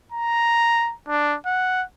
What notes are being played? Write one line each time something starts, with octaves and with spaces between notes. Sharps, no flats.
A#5
D4
F#5